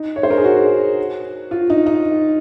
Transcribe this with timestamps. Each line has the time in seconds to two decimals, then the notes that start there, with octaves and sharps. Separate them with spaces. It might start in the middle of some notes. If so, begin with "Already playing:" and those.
Already playing: D#4
0.16 C#5
0.23 C5
0.30 A#4
0.37 G#4
0.44 F#4
1.51 F4
1.70 D#4
1.86 D#4